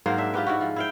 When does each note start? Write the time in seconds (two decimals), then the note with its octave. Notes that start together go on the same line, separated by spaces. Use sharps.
0.06 G#2 F#3 A#3 C5
0.18 D4 E5
0.34 F4 G4 B4
0.47 G#2 E4 F#4
0.61 F3
0.76 E4 F5 G5